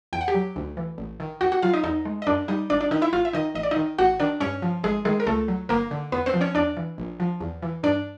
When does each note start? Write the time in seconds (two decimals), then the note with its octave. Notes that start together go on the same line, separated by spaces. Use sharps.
0.13 E2 G5
0.21 F#5
0.28 G4 G5
0.34 F#3
0.56 D2
0.77 E3
0.98 A1
1.20 D#3
1.41 D#2 F#4 F#5
1.52 F#4 F#5
1.62 F#3 F4 F5
1.73 D#4 D#5
1.83 E2 D#4 D#5
2.05 G#3
2.22 D#5
2.27 F#2 D4 D5
2.48 G3 D#4 D#5
2.70 G#1 D4 D5
2.81 D4 D5
2.91 D#3 D#4 D#5
3.02 E4 E5
3.13 G#1 F4 F5
3.25 E5
3.33 D#3 D#4 D#5
3.55 A1 D#5
3.63 D5
3.71 D#4 D#5
3.76 D#3
3.98 A1 F#4 F#5
4.20 D#3 D4 D5
4.40 G2 C#4 C#5
4.62 F3
4.83 G#1 G#3 G#4
5.05 D#3 G#3 G#4
5.20 A#4
5.27 C#2 A3 A4
5.48 F#3
5.69 G1 A#3 A#4
5.91 D3
6.12 E2 B3 B4
6.26 C4 C5
6.34 F3
6.41 C#4 C#5
6.55 E2 D4 D5
6.77 E3
6.98 A#1
7.20 F3
7.41 E2
7.62 E3
7.83 G2 D4 D5